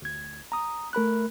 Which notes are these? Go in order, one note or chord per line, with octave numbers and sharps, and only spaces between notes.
D2 G#6
A#5 D#6
A3 A#4 B5 F#6